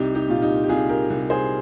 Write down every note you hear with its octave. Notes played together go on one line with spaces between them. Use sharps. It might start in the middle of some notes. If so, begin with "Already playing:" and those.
Already playing: C2 D#4 G4
D#4 G4
A#2 F4
D#4 G4
G4
C2 F4 G#4
G4 A#4
C2
G#4 C5